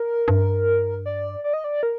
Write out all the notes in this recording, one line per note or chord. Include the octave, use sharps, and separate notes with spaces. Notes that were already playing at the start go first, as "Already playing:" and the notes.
Already playing: A#4
G2
D5
D5
D#5
D5
A#4